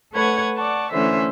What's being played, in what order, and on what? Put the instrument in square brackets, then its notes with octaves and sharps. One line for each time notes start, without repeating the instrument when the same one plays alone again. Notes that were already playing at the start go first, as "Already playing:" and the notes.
[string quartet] A3 A4 B4 C#5 F#5 G#6
D5 F#5 A5 C#6
D3 E3 A3 C#4 C5 E5